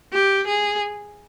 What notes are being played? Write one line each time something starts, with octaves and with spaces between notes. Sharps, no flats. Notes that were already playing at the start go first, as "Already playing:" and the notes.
G4
G#4